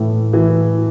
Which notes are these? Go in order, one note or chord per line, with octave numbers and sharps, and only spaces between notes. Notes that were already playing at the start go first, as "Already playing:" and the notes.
Already playing: A2 E3
E3